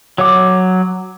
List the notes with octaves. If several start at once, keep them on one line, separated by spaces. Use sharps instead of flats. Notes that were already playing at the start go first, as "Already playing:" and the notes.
F#3 C#5 F#5 D6